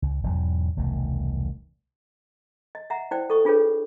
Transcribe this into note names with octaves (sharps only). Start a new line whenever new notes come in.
C#2
E1 E2 G#2 F#3
E1 C2 D#3 A3
D#5
E5 F#5 A#5
E4 C5 D5 G5
A4 D#5 C#6 D#6
D4 F4 G#4 A4 B4 C#5